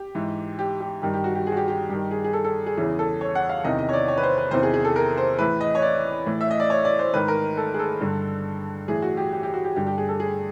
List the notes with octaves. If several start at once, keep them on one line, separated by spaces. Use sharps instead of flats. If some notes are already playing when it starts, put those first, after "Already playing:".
Already playing: G4
G#2 E3
G4
G4
G2 D#3 G4
G4
F#4
G4
G#4
F#4
G4
G4
G2 D#3 G4
G#4
G#4
A4
A4
G#4
E2 C#3 E3 G#4
A4
C#5
F#5
F5
E2 C3 D#3 D#5
D#5
C#5
D5
C#5
B4
C5
B4
E2 C3 D#3 C5
G#4
G#4
A4
A#4
C5
A2 E3 B4
D#5
C#5
D5
A2 E3
E5
D#5
D5
C#5
D5
C5
G#2 D#3 B4
A#4
A4
G#4
A4
G2 D3
A2 E3 G#4
F#4
G4
G4
G4
F#4
G4
G2 D3 G4
G4
G#4
A4
G#4